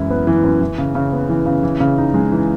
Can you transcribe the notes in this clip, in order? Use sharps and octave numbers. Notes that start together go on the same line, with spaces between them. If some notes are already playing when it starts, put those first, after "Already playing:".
Already playing: F#2 E3 G#3 E4
B3
E3
F#2
E3
C#3
C#3
B3
E3
C#3
E3
C#3
D#4
G#3
E3